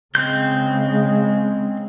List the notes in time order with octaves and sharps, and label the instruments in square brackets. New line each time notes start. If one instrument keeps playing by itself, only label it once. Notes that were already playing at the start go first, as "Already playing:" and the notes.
[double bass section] C#3 G#3 [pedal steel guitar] C4 C6 G6